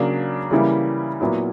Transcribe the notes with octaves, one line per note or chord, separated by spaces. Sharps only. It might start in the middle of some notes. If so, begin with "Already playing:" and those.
Already playing: C#3 F#3 A#3 D4
C#3 E3 G3 A#3 E4
A#2 F#3 B3 E4